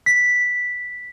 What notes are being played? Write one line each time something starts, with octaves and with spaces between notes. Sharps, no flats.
B6